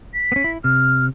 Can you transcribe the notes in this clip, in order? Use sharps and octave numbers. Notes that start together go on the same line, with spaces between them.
B6
B3 C#4
E4
C3 F6